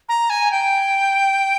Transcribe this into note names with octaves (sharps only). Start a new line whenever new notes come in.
A#5
G#5
G5